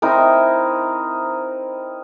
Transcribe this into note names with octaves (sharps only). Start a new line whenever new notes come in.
C4 D#4 E4 A#4